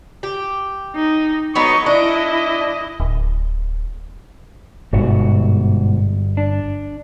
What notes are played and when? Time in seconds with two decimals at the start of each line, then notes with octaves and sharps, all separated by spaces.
0.23 G4
0.96 D#4
1.55 F#3 B3 D#4 D#5 C#6
1.86 D4 E4 D#5
3.00 D1
4.93 G1 G#2 B2 F#4
6.37 D4